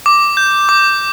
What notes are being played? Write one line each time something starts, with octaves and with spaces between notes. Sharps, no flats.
D6
G6
D6